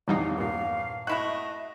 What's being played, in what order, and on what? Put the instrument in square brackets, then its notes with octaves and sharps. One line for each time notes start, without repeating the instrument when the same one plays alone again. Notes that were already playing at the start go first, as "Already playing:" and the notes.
[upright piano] D#1 E2 [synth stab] E3 G3 D#4 [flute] F5
[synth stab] G2 A#2 [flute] F5
[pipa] A3 E4 F#4 [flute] D#5 [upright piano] F#6